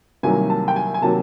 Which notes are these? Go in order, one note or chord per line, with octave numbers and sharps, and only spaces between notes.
C2 C3 D#3 F#3 A#3 G#5
A5
G5
G#5
G#5
C3 D#3 F#3 A#3 A5